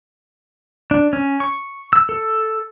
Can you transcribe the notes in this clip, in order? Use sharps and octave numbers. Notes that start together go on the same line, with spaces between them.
D4
C#4
C#6
E6
A4